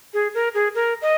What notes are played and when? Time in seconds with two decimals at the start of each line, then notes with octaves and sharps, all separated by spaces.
0.14 G#4
0.35 A#4
0.54 G#4
0.75 A#4
1.02 D#5